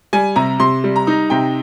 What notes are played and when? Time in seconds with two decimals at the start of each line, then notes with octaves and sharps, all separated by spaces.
0.13 G3 G#5
0.36 C3 A#5
0.60 C3 C6
0.84 G3
0.96 A#5
1.07 D#4
1.30 C3 G5